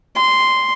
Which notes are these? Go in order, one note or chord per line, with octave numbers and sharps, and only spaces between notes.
C6